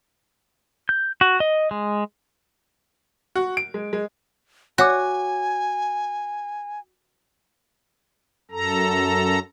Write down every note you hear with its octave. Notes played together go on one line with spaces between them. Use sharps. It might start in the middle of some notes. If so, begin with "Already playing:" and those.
G6
F#4
D#5
G#3
F#4
D7
G#3
G#3
F#4 C#5 G#5 D6
F#2 A4 A#5